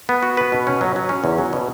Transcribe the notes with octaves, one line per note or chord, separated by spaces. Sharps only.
B3
F#4
B4
B2
C#4
F#3
F#3
C#4
E2
F#3
B2